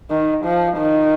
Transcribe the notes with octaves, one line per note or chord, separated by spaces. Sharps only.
D#3
F3
D#3